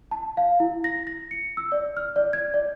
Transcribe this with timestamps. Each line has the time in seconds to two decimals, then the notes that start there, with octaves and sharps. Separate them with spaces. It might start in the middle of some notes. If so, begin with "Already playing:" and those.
0.11 A5
0.37 F5
0.60 E4
0.84 A#6
1.07 A#6
1.31 C#7
1.57 E6
1.72 D5
1.97 F6
2.16 D5
2.33 G#6
2.54 D5